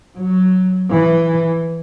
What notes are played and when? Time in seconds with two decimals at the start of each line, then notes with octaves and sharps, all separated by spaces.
0.18 F#3
0.89 E3